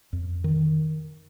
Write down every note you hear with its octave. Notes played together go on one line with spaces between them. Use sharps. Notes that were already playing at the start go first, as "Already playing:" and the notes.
F2
D#3